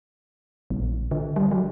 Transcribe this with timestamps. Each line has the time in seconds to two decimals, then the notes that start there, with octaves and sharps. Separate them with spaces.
0.70 A#1
1.11 D3
1.36 G3
1.51 F#3